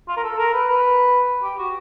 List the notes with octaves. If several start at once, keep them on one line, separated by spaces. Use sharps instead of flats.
F4
A#4
A4
A#4
B4
B4
G4
F#4